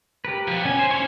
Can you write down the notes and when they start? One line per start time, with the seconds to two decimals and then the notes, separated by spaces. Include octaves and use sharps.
0.25 G4 A#4 B4
0.48 F3 B3
0.65 D2 C#4 G#5
0.79 C5
0.91 C#4 E4 C#6